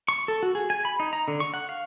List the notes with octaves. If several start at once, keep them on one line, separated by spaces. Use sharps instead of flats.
C#6
A4
F#4
G#4
G#5
B5
D#4
A#5
D3
C#6
F#5
F5